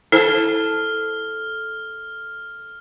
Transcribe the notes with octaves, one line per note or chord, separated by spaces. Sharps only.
E4 A4 C5 A5 F6